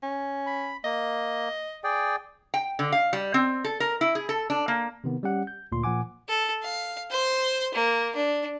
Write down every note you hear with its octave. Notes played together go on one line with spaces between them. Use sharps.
C#4
B5
A#3 D#5
G#4 D5 G5
G5
D3
F5
G3
C4
A4
A#4
E4
G#4
A4
D4
A#3
C3 D#3 B3
G3 C#4 G4 F#5
G6
D2 A#2 C6
A#2 F3 F#5 G#5 D6
A4
F5
C5 C6
A#3
D4